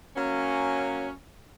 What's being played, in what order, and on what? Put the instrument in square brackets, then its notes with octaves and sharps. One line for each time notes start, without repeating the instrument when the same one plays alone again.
[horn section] F#3 A#3 C#4